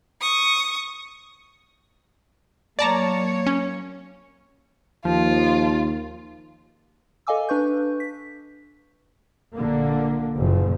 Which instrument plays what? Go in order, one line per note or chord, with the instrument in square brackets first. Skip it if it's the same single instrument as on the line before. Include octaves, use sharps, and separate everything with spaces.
[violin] C#6 D#6
[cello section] F#3 A#3 C#5 [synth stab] D5 A5 A#5
[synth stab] C#4
[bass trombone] D#2 [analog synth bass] F3 [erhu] F4
[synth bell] A4 D#5 F5 G#5 D6 E6
D4 B4 C#6 G6
B6
[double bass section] A#1 D3 A#3
F#1 A#2 F3